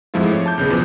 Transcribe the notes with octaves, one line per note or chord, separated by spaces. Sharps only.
F2 G#2 F3 A3 E4 F4
C#5
A5 D6 G6
B1 C#3 B3
E2 F3 B4